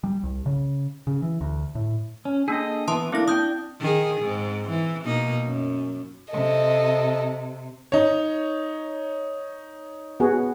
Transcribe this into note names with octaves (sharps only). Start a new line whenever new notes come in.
G3
C2
C#3
C#3
E3
D2
A2
C#4
A#3 D4 G#4 A4 D#5
E3 B3 A5 C6 D#6
A3 A#3 C4 D4 E4 A#6
D4 G5 D#6 G6
D#3 G#4
G#2 C4
E3
B2 A#3 D#4
F#2
C3 A4 D#5
D#4 C#5
B3 F#4 G#4